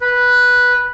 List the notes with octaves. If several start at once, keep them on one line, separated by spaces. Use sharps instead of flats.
B4